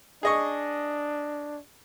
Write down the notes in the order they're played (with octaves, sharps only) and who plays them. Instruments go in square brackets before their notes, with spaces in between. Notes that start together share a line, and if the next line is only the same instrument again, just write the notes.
[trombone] D4 [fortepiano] G#4 D#5 C#6